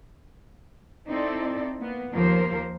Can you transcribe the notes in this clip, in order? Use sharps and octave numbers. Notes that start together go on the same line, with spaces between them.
C4 D#4 E4 A4 D5
A#3 B3
D#2 F3 A#3 A#4 C5